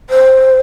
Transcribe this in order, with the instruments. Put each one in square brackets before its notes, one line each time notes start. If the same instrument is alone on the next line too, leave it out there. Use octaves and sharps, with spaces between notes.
[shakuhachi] C5